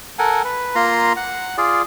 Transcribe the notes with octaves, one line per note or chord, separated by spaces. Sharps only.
A4 A#4 F#5 G#5
B4
A#3 F4 A#5 C6
F#5
F4 G#4 D5